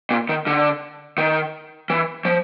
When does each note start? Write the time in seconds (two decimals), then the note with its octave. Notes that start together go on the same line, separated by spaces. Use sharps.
0.11 A#2
0.29 D#3
0.47 D3
1.18 D#3
1.90 E3
2.25 F3